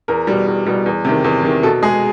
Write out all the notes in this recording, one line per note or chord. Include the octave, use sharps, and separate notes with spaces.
E2 A#4
B2 G3
E2
B2 G3
E2
C3 D#3
E2
C3 D#3
B2 A4
G#3 G#4